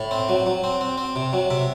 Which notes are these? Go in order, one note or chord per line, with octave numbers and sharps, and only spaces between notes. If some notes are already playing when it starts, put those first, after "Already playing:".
Already playing: A2
C4
F#3
F#3
C4
C4
C4
C3
F#3
C3 E5